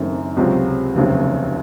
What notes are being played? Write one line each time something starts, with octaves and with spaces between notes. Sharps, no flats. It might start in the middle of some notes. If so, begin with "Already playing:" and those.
Already playing: F#1 F#2 D#3 A3 C4
C#2 C3 F#3 C4 F4
F1 D#2 C#3 F#3 C4